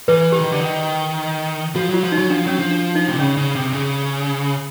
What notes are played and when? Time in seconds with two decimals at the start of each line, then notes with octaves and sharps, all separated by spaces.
0.08 E3 B4
0.32 E3 G4
0.41 D#3
0.52 D3
0.61 D#3
1.76 F3 F#4
1.90 F#3 F4
2.04 F3
2.12 D#4
2.18 F#3
2.30 F3 D4
2.46 F#3 C#4
2.59 F3
2.71 D4
2.95 D#4
3.08 C3
3.19 C#3 C#4
3.37 C#3
3.55 C3
3.73 C#3